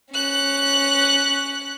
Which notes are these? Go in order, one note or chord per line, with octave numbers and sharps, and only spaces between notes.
C#4 F#6